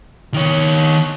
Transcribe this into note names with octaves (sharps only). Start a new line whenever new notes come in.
D#3 C#5